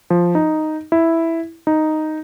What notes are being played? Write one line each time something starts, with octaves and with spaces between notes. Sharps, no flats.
F3
D#4
E4
D#4